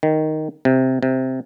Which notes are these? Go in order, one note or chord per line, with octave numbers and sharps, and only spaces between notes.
D#3
C3
C3